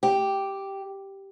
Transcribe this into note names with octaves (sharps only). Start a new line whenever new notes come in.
G4